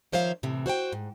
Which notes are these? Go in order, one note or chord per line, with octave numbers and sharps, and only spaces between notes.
D#3 F3 C5 C#5 E5 F5
A2 C3 E3
F#4 C5 F#5 G5
G#2